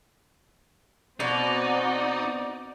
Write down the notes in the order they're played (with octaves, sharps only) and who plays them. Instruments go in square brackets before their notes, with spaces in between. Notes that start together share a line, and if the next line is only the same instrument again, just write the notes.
[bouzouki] B2 [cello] C4 F#4 [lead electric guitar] D#4 [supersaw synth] D5